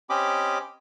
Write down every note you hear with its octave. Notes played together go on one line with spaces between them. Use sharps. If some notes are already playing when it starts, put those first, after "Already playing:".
C4 C#4 G4 D#5 B5 D6